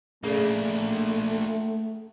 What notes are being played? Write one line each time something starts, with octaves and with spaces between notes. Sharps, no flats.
C#3 A3 A#3 D4